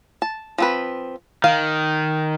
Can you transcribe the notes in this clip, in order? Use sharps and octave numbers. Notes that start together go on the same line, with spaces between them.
A5
F3 C4 B4
D#3 F5